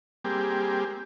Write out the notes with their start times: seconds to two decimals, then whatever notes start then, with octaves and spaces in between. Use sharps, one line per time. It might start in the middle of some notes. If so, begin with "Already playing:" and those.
0.25 G3 A#3 C4 G4 G#4